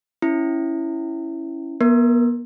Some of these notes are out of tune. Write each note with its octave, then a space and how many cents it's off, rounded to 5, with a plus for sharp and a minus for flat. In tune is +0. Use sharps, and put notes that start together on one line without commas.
C#4 +0 E4 +0
B3 -45 A#4 -5